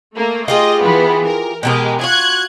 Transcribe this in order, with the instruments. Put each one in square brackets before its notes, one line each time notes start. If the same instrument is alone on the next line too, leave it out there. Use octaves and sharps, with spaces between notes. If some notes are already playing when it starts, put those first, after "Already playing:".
[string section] A3 A#3
[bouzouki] F4 G4 G#4 [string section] D#5
[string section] E3 B3
A#4
[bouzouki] B2 A4 A#4 [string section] G#3 G4
[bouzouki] F4 F#4 [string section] F#6 G#6